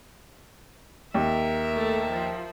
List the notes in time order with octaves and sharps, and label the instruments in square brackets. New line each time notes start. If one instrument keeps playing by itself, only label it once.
[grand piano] D#2 [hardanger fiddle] A#4 E5
[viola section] A3 A5
F3